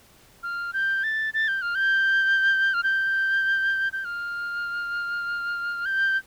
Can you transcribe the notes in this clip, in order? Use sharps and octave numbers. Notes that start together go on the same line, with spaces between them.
F6
G6
A6
A6
G6
F6
G6
F6
G6
G6
F6
G6